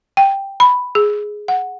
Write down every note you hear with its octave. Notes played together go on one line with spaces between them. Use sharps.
G5
B5
G#4
F#5